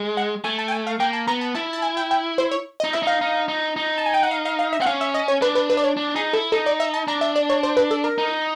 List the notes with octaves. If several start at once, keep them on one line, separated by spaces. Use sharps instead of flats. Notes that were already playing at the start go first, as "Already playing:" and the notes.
Already playing: G#3
F#5
A3 G#5
A5
G5
G#5
F5
A#3 G5
A5
B3 A#5
A5
E4 A5
A5
G#5
G5
G5
C5
C#5
D#5
D#4
E4 E5
D#4 F5
D#4
D#4
D#4
A5
G#5
G5
F#5
F5
F5
F5
E5
C4 F#5
C#4 F5
E5
D#5
C#5
D4 B4
B4
B4
D5
C#5
D4
D#4 G#4
E4 A4
D#4 A4
D5
E5
A5
D4 A#5
E5
D5
C#5
C5
B4
A4
A#4
D#4